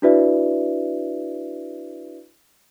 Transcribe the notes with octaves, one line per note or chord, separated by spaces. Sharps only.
D4 E4 F#4 B4 D5 E5